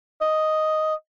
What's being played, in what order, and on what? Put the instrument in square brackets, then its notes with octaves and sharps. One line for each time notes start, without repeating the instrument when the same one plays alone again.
[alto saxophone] D#5